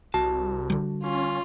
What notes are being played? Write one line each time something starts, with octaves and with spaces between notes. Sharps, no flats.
C2 F#4 A5
D3 G3
C#4 F4